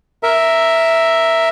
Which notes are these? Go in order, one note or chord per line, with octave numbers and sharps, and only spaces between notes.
A#4 E5